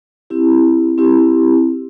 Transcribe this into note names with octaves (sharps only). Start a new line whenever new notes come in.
C4 E4 G4
C4 E4 G4